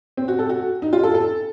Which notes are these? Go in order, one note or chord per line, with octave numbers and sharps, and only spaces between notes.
C4
F#4
A4
F#4
D#4
F4
A4
A4